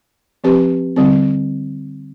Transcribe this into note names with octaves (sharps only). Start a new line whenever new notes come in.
F3 C4 G4 B4
D3 G3 C4